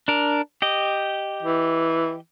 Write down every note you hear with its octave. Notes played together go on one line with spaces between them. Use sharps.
D4 A#4
G4 D#5
E3